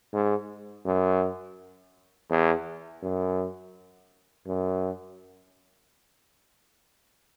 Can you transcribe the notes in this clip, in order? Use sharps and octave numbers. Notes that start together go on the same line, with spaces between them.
G#2
F#2
E2
F#2
F#2